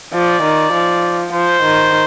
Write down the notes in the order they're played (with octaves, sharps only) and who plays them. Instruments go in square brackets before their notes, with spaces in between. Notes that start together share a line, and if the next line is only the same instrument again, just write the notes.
[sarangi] F3 [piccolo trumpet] D5
[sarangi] D#3
F3
[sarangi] F3 [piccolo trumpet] C5
[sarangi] D#3